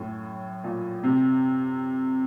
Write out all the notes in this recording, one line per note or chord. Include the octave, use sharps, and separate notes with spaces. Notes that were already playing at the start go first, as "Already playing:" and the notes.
Already playing: F#2 A2
A#2
C3